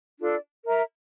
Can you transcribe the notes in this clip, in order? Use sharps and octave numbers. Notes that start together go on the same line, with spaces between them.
D4 F4 A4 D5
A#4 E5 A#5